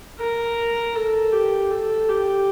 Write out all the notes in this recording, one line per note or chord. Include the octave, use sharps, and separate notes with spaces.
A#4
A4
G4
A4
G4